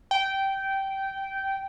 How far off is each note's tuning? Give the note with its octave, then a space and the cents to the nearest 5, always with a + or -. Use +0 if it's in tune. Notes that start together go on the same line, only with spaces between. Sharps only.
G5 -15